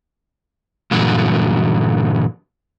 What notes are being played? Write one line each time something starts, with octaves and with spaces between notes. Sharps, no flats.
G2 A#2 D3 E3 F#3